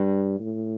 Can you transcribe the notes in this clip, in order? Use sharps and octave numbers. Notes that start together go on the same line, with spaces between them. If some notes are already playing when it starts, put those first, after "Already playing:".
Already playing: G2
A2